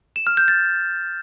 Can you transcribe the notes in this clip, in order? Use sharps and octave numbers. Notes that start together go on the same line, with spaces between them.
E7
F6
G6
A6